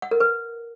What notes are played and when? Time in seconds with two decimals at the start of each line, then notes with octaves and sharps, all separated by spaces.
0.02 F#5
0.11 A#4
0.20 B4